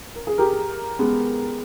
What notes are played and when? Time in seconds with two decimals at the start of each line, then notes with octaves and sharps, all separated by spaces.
0.15 A#4
0.27 G#4
0.38 G4 A#4
0.99 G#3 B3